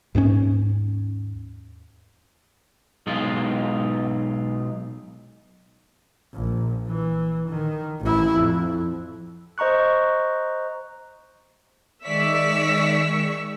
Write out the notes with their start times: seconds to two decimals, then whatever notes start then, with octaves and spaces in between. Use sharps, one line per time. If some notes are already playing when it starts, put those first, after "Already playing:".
0.15 D#2 G#2 G3 C#4
3.07 B1 G#3 F4
6.34 A#1
6.87 E3
7.48 D#3
8.02 A1 E4
8.35 F2
9.58 C5 D#5 A#5 C#6 F#6
12.05 D#3 G#3 D5 E5 C#6 E6 B6